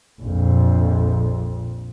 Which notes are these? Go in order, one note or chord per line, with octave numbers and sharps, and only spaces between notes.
A#1 F2